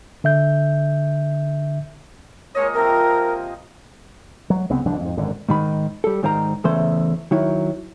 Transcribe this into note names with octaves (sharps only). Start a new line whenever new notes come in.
D3 E5 G6
G#3 A#3 C#5 D#5
C3 F3 C4 A#4
F#3
C2 C#3 B3 C4
F1 C2 F3 D4
F2 G#2
G#1 F#2 D3
G#2 D#3 B5
G3 A4
G#2 D#3 C5 D5 A#5
E2 C#3 E3 A3 C5
D#3 F#3 E4